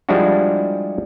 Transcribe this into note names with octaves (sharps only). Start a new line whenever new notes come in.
F3 G3 G#3 D4 E4 F#4